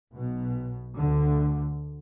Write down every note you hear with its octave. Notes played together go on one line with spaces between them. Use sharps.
B1 B2
D2 D3